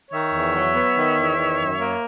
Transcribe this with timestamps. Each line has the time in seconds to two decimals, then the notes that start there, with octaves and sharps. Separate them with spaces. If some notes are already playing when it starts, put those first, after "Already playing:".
0.11 D#3 C#5 E5
0.33 E2
0.54 F#3
0.74 B3
0.95 D#3
1.17 E2
1.37 D#3
1.58 F#2
1.79 A#3